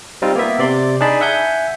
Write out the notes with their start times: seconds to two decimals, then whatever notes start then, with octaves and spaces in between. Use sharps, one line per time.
0.22 G3 C4 D#4 F4
0.36 A#3 B3 E5
0.59 C3 D5 C6
1.01 D4 D#4 G#4 D5 A5 B5
1.21 E5 F#5 G#5 G6